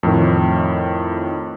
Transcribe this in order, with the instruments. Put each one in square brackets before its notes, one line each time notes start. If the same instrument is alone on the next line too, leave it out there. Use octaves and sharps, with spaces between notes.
[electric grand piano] F2 A2 D#3